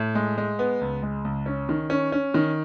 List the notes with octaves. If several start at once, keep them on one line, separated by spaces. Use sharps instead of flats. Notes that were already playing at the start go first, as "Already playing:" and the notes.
Already playing: A2
G#3
G#3
B3
C#2
G#3
C#2
C#4
D#3
C#4
C#4
D#3